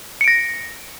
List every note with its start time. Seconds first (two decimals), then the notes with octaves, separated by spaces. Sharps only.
0.21 C#7
0.24 D7
0.28 A#6